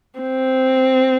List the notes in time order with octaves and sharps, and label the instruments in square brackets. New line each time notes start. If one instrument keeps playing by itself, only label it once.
[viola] C4